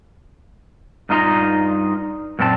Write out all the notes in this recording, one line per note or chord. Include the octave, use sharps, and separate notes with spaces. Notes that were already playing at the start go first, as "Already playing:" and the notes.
G2 D#4 F4 D#5 A#5
F#2 A#2 C4 F#4 A5